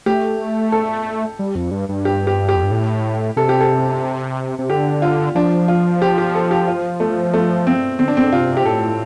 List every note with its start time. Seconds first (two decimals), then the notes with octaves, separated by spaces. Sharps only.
0.06 A3 G4
0.72 A4
1.39 G3
1.55 F2
1.71 G2
1.89 G2
2.05 G4
2.27 G4
2.49 G4
2.56 F2
2.63 G2
2.71 A2
3.36 C3 A4
3.49 G4
3.61 A4
4.59 C3
4.70 D3 G4
5.02 F4
5.35 F3 D4
5.68 F4
6.02 G4
6.18 G4
6.35 A4
6.51 G4
6.68 F4
7.00 A3
7.34 A3
7.67 C4
7.99 D3 C4
8.08 D4
8.17 C4
8.33 C3 F4
8.57 G4
8.66 A2 A4